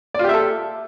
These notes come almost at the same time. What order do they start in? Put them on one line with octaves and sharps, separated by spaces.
D5 F4 G4 E5 A4